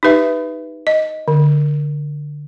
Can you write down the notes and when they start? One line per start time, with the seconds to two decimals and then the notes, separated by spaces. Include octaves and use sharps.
0.03 D#4 G4 B4 E5
0.87 D#5
1.28 D3